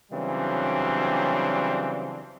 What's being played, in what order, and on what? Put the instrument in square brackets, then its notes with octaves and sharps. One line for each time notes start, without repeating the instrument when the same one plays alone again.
[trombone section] C#3 E3 F#3 G3 C4 D4